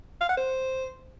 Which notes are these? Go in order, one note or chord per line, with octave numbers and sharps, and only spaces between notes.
F5
F#5
C5